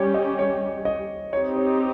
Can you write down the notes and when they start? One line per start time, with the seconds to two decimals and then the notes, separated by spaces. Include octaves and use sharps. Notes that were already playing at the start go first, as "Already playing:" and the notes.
Already playing: G3 C#4 G4 C#5
0.14 D#5
0.39 C#5
0.85 D#5
1.32 C4 D#4 G4 C#5
1.56 C#5